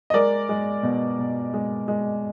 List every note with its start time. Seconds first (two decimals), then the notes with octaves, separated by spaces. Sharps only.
0.10 D#5
0.13 G#3 A#4 D5
0.49 G#3
0.83 B2
1.19 B2
1.54 G#3
1.88 G#3